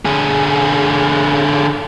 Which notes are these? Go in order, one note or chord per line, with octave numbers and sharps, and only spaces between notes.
D3 G#4